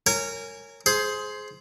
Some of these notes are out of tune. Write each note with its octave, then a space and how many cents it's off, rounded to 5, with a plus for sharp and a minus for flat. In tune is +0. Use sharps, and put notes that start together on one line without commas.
A#4 -20 C#5 +0 G#5 +0
G#4 +20 C5 +0